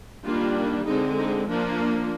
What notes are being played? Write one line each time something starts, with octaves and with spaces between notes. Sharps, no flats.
D#3 G3 A#3 D4 F4
D3 G#3 C4 D#4
D#4
F3 A#3 D4